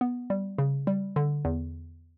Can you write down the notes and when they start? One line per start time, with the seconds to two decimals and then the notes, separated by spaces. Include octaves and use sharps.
0.01 B3
0.30 G3
0.58 C#3
0.87 G3
1.16 D3
1.45 E2